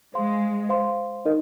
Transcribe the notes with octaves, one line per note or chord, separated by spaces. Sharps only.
G#3 C5 F5 C6
C5 F5 C6
D#4 A#4 D#5